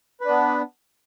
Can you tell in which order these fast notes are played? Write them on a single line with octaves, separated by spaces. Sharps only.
B4 D4 B3